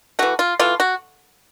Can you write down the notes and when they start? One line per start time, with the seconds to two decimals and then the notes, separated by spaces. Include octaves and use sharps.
0.19 E3 A3 F#4
0.39 F4
0.59 E3 A3 F4
0.80 F#4